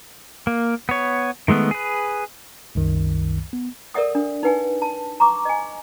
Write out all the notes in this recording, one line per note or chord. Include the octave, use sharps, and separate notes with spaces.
A#3
B3 C#5
D#3 G#3 A3 B3
G#4 B4
C2 F#2 D#3
B3
A4 A#4 D5 E5 F#5 D#6
D4
D#4 B4 F#5 G#5
A5
A#5 C#6 D6
D#5 G#5